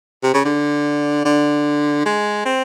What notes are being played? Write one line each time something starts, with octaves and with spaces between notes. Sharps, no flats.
C3
C#3
D3
D3
G#3
C4